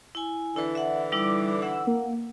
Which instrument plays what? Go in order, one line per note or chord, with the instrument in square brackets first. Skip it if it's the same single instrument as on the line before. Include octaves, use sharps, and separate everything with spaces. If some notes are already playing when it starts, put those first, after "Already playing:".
[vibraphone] E4 G#5
[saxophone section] D3 E3 D5 [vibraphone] E4 B4
[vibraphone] E5 F#5
[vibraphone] G3 D#4 E4 [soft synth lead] D6
[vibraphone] F#5 [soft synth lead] E6
[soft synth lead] A#3